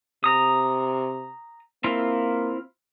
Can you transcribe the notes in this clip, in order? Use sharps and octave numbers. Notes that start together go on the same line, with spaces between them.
C3 A#5 D#6
A#3 C4 E4 F4